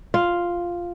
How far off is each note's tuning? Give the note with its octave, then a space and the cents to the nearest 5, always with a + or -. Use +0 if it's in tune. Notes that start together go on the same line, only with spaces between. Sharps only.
F4 +0 F5 +0